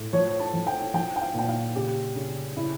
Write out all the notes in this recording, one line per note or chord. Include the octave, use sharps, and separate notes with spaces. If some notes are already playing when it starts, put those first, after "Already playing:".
Already playing: A2
F3 C#5
A5
F3
G5
F3 G5
G5
F5
A#2 G5
F5
C#3 G4
C#3
C#3 E4